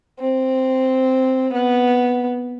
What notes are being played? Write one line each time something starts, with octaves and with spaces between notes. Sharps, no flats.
C4
B3